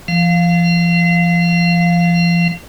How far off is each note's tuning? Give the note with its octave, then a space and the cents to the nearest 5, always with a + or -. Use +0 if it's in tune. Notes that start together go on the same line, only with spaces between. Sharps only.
F3 -35 F5 +5